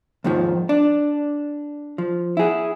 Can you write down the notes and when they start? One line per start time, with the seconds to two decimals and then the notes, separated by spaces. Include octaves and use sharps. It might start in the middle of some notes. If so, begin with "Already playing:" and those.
0.24 D#2 G#2 D#3 F3
0.69 D4
1.98 F3
2.37 E4 G#4